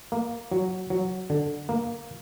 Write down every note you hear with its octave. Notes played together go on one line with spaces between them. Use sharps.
A#3
F#3
F#3
D3
A#3